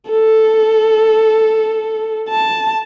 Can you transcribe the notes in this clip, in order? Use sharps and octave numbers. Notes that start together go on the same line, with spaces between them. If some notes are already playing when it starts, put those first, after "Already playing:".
A4
A5